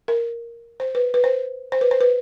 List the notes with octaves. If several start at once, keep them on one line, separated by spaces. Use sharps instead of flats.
A#4
C5
B4
B4
C5
C5
B4
C5
B4